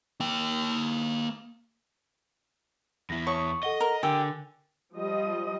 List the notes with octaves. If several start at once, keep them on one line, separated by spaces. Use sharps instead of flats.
A#3 G5
E2 E4 A#6
C#5 A5 C#6 D#6
A4 D#5 F#5 G7
A#4
D3 G4 A#4 G#5 E6
F3 G3 D#5